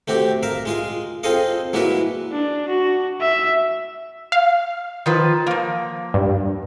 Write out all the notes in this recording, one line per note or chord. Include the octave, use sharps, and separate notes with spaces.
A3 C4 F#4 G4
A#4 E5 F5
G#3 F4 G#4
C4 F4 G#4 A4 D#5 F5
F#3 G#3 A#3 E4 F#4 B4
D4
F#4
E5
F5
D#3 F3 B4
F3 A#3
G2